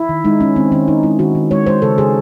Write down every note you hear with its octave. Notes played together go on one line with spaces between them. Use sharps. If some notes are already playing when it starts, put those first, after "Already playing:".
Already playing: E4
D#3
G#3 D#4
G#3 C#4
D#3 C4
D#3 C#4
G#3 D#4
G#3 E4
D#3 F#4
D#3
G#3 C#5
G#3 C5
C#3 A4
C#3 G#4